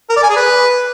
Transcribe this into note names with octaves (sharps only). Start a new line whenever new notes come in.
A#4
D5
G#5
G#4
B4